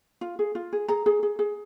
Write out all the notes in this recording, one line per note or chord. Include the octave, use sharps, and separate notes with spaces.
F4
G#4
F4
G#4
G#4 A#5
G#4
G#4
G#4